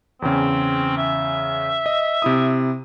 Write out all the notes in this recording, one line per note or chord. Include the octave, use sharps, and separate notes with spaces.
E2 C#3 C4
E5
D#5
C3 E4 D#6